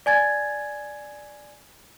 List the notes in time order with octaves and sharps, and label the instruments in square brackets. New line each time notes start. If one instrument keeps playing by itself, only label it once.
[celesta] D5 G#5 G#6 A6